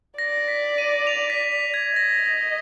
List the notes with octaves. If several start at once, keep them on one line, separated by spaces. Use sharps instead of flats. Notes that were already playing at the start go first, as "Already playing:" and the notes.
D5 A#6
B6
D#7
F7
B6
B6
G#6
D#5 A#6
A#6